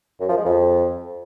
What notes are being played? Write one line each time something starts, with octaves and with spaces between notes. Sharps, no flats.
F#2
F3
G#3
F2